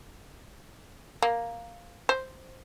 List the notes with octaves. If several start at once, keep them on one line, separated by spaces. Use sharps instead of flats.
A#3
C5